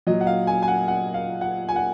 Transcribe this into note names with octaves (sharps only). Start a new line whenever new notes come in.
A#2 F#3 D#5
F#5
F5
G#5
G#5
F#5
F#5
F5
F#5
G#5
F#5